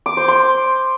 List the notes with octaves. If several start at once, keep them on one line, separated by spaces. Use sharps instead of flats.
D6
C5
C6